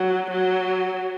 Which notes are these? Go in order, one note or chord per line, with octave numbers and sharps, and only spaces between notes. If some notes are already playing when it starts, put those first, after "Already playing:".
Already playing: F#3
F#3